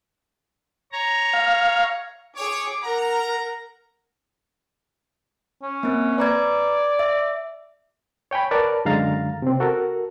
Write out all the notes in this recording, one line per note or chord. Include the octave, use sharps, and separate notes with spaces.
C#5 A#5
F5
G#4 C#5 D6
A#4 F#5 A#5
C#4
A#3 C4
B4 D5 A#5 G#6
E5
C#5 G5 G#5 B5
A#4 B4 C#5 D5 A5
F#2 D3 G#3 F5 A#5 A6
C3 C4
F#4 A4 A#4